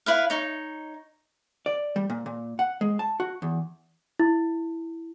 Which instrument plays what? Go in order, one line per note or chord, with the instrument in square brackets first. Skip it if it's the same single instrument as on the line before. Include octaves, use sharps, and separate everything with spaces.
[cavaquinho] E4 B4 F5
D#4 C#5
[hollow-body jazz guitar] D5
G3
A#2
A#2
F#5
G#3
A5
F#4
E2
[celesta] E4